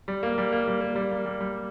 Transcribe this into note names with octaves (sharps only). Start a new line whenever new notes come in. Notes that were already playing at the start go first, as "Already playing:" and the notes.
G3
A#3
G3
A#3
G3
A#3
G3
A#3
G3
G3